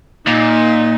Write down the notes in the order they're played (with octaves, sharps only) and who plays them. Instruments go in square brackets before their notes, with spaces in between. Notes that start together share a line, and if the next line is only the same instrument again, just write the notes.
[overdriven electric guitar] A#2 [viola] D#4